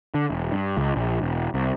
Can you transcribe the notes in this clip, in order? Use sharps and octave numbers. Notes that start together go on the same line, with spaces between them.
D3
E1
G2
C#2
A#1
E1
C2